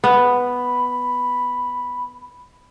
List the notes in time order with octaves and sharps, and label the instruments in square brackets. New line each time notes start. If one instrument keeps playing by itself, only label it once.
[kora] B3 [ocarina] B5